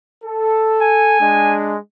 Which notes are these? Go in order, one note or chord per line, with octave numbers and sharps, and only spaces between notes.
A4
G#5
G#3 D4